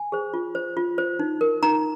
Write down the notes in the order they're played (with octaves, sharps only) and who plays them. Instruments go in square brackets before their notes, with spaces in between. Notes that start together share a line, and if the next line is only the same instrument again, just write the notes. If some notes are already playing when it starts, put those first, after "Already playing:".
Already playing: [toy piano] G#5
G#4 C5
F4
C5
F4
C5
D#4
A#4
D#4 A#5